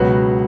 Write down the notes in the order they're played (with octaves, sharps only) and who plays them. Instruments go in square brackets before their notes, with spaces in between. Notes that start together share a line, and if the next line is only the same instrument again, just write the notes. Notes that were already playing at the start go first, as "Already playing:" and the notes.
Already playing: [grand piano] C#2 B2 F#3 F#4 B4